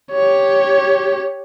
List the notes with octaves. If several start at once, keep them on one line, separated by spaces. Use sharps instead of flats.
G4 C#5